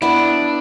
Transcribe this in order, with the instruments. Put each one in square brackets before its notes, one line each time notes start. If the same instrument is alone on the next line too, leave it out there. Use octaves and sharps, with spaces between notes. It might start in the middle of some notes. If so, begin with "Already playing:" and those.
[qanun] B3 E4 [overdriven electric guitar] D4